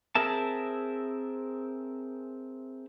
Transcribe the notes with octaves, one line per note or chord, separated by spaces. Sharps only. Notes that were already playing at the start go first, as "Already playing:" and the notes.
C4 G#4 A#4 E5 A5